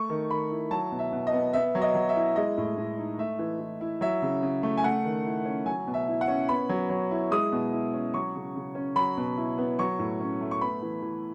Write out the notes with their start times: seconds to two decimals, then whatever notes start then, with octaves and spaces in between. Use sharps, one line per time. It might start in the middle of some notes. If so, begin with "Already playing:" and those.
Already playing: A3 C#6
0.09 D#3
0.31 D#3 B5
0.51 E4
0.71 F#3 A5
0.92 B2
0.99 E5
1.13 B2
1.27 D#5
1.33 B3
1.53 B3 E5
1.75 F#3
1.82 D#5
1.95 F#3
2.09 E5
2.16 E4
2.36 G#3 D#5
2.58 A2
2.78 A2
2.98 D#4
3.18 A3 E5
3.39 E3
3.60 E3
3.81 E4
4.01 F#3 E5
4.22 C#3
4.42 C#3
4.63 A3
4.77 G#5
4.84 A3 F#5
5.05 D#3
5.25 E4
5.45 C#4
5.66 F#3 G#5
5.87 B2
5.94 E5
6.08 E4
6.21 F#5
6.28 C#4
6.49 B3 B5
6.69 F#3
6.90 F#3
7.11 E4
7.31 G#3 D#6
7.52 B2
7.73 E4
7.93 C#4
8.14 F#3 C#6
8.35 C#3
8.55 C#3
8.75 C#4
8.96 F#3 B5
9.17 B2
9.37 E4
9.58 B3
9.79 F#3 C#6
9.99 A2
10.20 C#4
10.41 A3
10.51 C#6
10.61 B3 B5
10.82 E3
11.02 E3